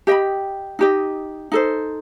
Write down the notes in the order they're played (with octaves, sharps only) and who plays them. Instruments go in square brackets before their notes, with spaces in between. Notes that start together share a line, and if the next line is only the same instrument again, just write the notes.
[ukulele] G4 D#5 G5 B5
D#4 G4 D#5
D#4 A4 C5